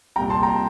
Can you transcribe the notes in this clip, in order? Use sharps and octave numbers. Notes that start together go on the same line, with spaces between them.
C2 A#2 G3 G5 A#5
A5 C6
G5 A#5